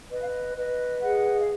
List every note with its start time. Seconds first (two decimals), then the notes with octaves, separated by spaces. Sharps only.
0.10 B4 D#5
0.20 F5
0.29 D#5
0.55 B4 D#5
1.00 G#4 D#5 F#5
1.39 F5